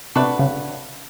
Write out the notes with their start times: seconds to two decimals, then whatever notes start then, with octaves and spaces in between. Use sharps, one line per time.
0.15 C3 A3 D4 F#4 B4
0.39 C#3